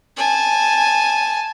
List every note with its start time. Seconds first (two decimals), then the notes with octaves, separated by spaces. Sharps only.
0.17 G#5 A5